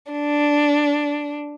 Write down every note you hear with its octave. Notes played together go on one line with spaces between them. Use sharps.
D4